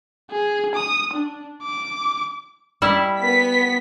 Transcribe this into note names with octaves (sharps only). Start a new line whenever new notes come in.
G#4
D#6
D4
D6
G3 E4
B3 B6